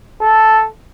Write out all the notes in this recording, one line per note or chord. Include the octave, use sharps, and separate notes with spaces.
A4